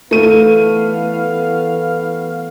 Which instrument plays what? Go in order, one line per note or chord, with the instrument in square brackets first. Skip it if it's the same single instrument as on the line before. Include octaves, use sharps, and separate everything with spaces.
[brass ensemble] E3 B3 F5 [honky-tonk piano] A3 D#7